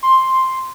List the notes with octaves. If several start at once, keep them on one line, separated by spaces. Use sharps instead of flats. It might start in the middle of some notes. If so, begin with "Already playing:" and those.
C6